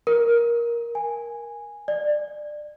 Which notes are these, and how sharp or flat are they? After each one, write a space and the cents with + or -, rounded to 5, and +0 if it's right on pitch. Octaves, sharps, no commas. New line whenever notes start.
A#4 +10
G#5 -10
D5 +25